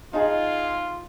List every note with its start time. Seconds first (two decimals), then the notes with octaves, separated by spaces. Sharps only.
0.13 D#4 F4 G#4